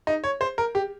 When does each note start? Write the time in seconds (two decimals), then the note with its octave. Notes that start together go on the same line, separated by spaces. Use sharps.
0.07 D#4
0.24 C#5
0.41 C5
0.58 A#4
0.75 G4